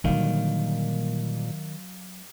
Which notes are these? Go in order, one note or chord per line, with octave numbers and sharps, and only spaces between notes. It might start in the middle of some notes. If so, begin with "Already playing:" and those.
A#2 D3 D#3 F#3 G3 F5